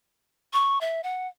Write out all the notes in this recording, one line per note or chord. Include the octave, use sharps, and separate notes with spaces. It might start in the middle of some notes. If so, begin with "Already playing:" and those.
C#6
E5
F#5